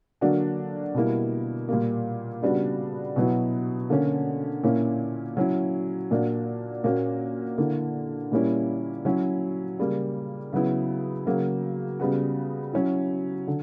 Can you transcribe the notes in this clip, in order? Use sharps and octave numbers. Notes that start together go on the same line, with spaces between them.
D3 F#3 A#3 D4 F#4
B2 G3 A#3 E4
A#2 G3 A#3
C#3 G3 B3 D4 F#4
B2 F#3 B3 E4
D3 A#3 C#4
A#2 A#3 C#4 E4
F#3 C#4 E4
A#2 A#3 D4 F#4
A#2 A#3 C#4 F#4
D3 A#3 E4
A#2 G3 A#3 C#4 E4
F#3 C#4 E4
C#3 G3 A#3
C#3 F#3 B3 E4
C#3 F#3 A#3
C#3 G3 B3 F#4
F#3 C#4 E4
D3